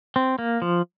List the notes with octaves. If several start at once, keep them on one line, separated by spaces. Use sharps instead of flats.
C4
A#3
F3